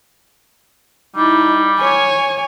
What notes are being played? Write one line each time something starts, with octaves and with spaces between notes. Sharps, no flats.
G3 D#4 E4
C#5 G#5